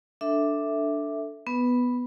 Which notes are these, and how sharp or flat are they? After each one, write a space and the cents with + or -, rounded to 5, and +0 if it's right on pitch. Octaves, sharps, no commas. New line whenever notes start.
D4 +0 A4 +10 E5 -5
B3 +0 B4 +0